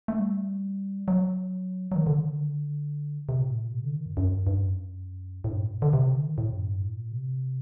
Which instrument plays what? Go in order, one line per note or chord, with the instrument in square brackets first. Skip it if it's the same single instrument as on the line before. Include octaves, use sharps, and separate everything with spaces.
[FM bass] A3
G3
F#3
F#3
D#3
D3
D#3
D3
C3
A#2
A2
A#2
C3
D3
D#3
G2
F#2
G2
G2
F#2
A2
G2
A#2
D3
C3
D3
D#3
A2
F#2
G2
A2
A#2
C3